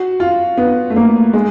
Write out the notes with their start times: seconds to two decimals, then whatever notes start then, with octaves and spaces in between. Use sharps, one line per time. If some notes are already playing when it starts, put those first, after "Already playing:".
Already playing: F#4
0.20 F4
0.58 B3
0.90 A3
0.96 A#3
1.33 G#3